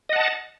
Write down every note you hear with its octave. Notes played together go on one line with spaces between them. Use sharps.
D#5 F#5 A5